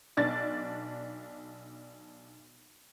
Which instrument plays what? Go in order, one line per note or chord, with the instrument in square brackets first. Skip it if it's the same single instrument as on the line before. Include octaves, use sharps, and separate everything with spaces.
[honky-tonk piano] B1 D4 A6